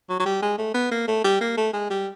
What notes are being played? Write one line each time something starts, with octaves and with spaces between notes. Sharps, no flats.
F#3
F#3
G3
G#3
A3
B3
A#3
A3
G3
A#3
A3
G#3
G3